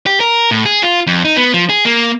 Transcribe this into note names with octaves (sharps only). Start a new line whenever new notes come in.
G4
A#4
A2
G#4
F4
F2
D#4
B3
F3
G#4
A#3